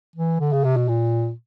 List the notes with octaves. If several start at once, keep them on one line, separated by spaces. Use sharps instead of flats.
E3
D3
C#3
C3
B2
A#2